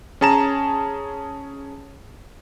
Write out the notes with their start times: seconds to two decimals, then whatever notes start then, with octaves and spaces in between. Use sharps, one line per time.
0.21 C#4 G#4 A5 A#5 E7